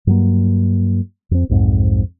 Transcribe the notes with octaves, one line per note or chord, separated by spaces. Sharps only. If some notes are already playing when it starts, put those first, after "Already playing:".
G2 F#3 A#3
F2 C4
B1 F2 G#2 C4